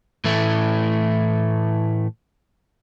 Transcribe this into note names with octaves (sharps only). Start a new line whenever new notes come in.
A2 E3 A3